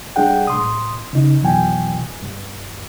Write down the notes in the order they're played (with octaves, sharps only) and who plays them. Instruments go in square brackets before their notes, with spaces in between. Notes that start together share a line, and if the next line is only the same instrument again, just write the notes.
[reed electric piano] G3 D4 G#4 F#5 G5
A2 C6 D#6
C#3 D#4
F2 B2 E3 F#3 G5 G#5
G2